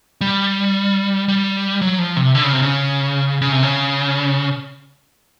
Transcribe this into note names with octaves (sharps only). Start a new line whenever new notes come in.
G3
G3
F#3
F3
C3
D3
C#3
C3
C#3
C#3
C3
C#3